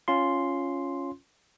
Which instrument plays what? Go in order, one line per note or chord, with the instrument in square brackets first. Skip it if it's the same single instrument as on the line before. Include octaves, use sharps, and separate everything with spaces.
[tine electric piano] C#4 F4 C6